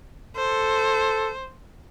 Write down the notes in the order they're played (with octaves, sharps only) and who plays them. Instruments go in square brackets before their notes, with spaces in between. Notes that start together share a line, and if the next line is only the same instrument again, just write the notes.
[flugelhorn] A4 [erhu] C5